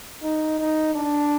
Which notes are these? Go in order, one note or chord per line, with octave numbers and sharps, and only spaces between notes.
D#4
D#4
D4